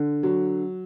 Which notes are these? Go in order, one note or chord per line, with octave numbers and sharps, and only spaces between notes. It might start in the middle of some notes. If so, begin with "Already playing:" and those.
Already playing: D3
F#3